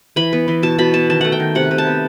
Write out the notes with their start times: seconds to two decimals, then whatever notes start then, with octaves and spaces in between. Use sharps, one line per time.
0.16 E3 B5
0.33 B3
0.48 E3
0.63 B2 A5
0.78 B2 B5
0.93 B3 A5
1.10 D#3 A5
1.21 A3 F#5
1.32 G5
1.40 D#3
1.55 C3 F#5
1.71 C3
1.78 A5
1.87 B3